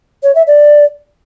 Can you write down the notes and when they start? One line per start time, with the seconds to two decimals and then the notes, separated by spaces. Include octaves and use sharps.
0.23 C#5
0.35 E5
0.47 D5